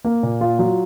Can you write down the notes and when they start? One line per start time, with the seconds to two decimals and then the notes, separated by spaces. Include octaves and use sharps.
0.05 A#3
0.23 A#2
0.41 F4
0.59 F#3